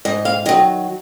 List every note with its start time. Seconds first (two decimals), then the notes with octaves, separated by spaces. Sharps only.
0.05 G#2 D#5
0.25 F5
0.46 D#3 D#5
0.49 F#3